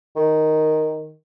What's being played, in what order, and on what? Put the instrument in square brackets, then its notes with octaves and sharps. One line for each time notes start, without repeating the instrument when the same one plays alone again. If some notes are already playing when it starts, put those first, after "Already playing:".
[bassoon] D#3